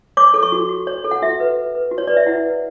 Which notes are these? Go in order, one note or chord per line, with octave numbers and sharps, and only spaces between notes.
C#5 D6
A4
C#6
F#4
F#4
C#5
A4
F#5
F#4 E5
B4
F#4
B4
F#4
C#5
B4 D5
E5
E4 F#5
B4